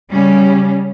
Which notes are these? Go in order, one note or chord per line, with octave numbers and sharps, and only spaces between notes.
C#3 G3 C#4